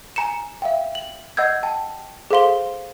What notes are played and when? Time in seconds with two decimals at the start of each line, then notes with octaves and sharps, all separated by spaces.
0.16 G#5 A#5 C#7 E7
0.62 E5 F5 G5
0.95 F#7
1.37 D#5 F#5 E6 G6 G#6
1.63 G5 A5
2.31 G#4 A4 C5 F5 C6 G7